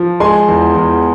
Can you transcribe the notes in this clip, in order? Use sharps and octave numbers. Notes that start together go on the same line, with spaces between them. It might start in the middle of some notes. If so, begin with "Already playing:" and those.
Already playing: F3
G#3 G#5 C6
E2
E2